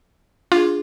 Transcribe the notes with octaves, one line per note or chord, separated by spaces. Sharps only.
D4 F4 G#4